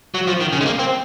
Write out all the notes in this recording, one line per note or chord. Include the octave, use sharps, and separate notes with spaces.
F#3
F3
D#3
C#3
G#3
A#3
C4